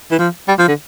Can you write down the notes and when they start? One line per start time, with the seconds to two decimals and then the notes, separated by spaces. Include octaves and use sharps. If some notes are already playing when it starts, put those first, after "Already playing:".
0.11 E3
0.19 F3
0.48 G3
0.58 F3
0.68 D3